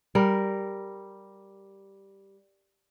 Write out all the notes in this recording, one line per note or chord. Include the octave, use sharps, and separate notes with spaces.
G3 A#4